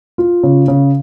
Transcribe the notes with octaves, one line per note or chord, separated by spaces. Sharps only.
F4
C#3
C#3